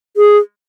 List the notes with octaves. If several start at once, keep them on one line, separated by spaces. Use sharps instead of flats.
G#4